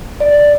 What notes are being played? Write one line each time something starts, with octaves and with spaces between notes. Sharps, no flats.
D5